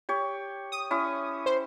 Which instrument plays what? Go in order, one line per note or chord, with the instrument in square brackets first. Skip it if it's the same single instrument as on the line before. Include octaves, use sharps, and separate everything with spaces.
[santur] G4 C#5
[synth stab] D#6
[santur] C#4 E4
[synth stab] C5